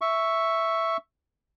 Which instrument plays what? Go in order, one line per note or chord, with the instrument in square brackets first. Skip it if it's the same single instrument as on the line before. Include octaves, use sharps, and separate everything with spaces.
[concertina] E5 C#6